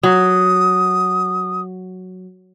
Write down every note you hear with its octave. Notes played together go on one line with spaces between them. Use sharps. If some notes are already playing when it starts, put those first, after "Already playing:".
F#3 D#6